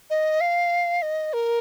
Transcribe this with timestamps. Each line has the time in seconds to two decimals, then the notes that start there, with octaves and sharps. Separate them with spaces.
0.10 D#5
0.41 F5
1.02 D#5
1.33 A#4